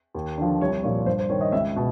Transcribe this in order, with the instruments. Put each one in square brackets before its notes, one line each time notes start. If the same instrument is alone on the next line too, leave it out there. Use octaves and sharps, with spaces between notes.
[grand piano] D#2
D3 F3
C2 C#5
A#2 F3 C#5
G2 C5
C5
D#3 C#5
D#5
C#2 E5
B2